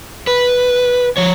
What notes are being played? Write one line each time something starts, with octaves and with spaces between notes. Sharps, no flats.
B4
F3 C#5